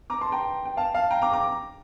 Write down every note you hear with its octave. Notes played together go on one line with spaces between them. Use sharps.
A#5 D6
A5 C6
G5 A#5
G5
F5 A5
F5 A5
G5 A#5
A#5 D6
A#5 D6